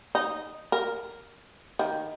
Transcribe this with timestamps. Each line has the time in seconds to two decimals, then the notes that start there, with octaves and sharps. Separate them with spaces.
0.15 D#4
0.72 A#4
1.79 D#3